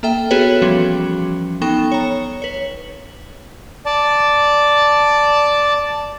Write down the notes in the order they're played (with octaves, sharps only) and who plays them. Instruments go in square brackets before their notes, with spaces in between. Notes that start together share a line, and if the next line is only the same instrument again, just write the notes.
[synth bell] A#3 A4 E5 G5
B3 F#4 G#4 A4 B4 C#5
E3 F3 G3 C#4 F#4
B3 D#4 A4 G5 C#6 E7
C#5 A#5
B4 C#5
[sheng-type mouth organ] D5 A5